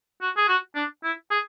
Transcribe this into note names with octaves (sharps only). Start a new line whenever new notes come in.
F#4
G#4
F#4
D4
E4
G#4